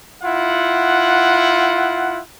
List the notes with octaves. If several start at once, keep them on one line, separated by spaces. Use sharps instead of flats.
E4 F4 F#5